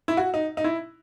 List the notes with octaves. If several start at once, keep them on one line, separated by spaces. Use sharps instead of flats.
E4
F#4
D#4
D#4
E4